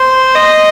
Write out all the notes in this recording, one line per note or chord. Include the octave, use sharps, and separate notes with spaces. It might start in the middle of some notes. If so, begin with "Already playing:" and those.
Already playing: C5
D#5